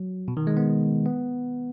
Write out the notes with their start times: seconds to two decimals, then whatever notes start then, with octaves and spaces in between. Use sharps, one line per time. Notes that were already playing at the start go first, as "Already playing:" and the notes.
Already playing: F#3
0.28 B2
0.37 D#3
0.47 G#3
0.57 B3
1.06 B3